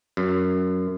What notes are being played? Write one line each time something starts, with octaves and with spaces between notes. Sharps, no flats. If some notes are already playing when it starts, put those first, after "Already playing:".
F#2